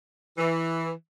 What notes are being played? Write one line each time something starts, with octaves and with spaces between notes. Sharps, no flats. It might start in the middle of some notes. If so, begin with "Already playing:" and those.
E3